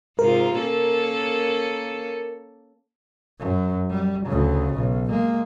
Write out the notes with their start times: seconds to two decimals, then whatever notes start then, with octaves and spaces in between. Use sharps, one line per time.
0.19 G#2 C3 F4 A#4
0.58 A#3 C#4 A4
3.39 F#2
3.90 G3
4.26 D2 C#3
4.74 B1
5.09 G#3 A#3